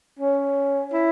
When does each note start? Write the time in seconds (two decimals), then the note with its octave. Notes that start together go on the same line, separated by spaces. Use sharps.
0.20 C#4
0.93 E4